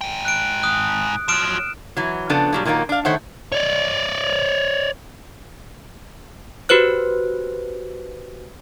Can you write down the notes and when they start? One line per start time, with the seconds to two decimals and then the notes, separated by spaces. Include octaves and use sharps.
0.01 G#2 G5
0.25 F#6 D7
0.63 D#6 F#6
1.28 F3 F#3 F6 D7 E7
1.97 E3 F#3
2.29 C#3 F3 B3 D4 A4
2.53 A#2 F#3 G3
2.65 A#2 D#3 F#3 A3 A#3
2.89 D4 F5
3.05 D#3 A3 C5 C#5 F#5
3.52 C#5 D5
6.69 F#4 G4 B4 C5 F#6